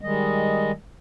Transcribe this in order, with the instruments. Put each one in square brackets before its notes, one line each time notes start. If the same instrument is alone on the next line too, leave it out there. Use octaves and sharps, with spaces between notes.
[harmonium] D#3 G3 G#3 D#5